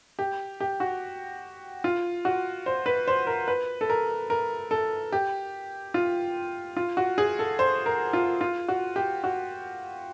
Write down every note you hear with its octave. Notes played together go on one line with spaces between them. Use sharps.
G4
G4
F#4
F4
F#4
C5
B4
C5
A#4
B4
A4
A#4
A#4
A4
G4
F4
F4
F#4
G#4
A4
C5
A#4
F4
F4
F#4
G4
F#4